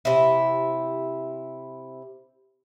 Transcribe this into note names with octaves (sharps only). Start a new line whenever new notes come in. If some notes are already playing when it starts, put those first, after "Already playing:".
C3 E4